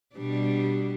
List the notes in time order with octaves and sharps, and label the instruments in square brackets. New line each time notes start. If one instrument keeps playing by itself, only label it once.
[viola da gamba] B2 G3 D4